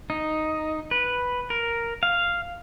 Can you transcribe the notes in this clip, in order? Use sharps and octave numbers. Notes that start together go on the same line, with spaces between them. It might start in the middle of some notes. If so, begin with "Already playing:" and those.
D#4
B4
A#4
F5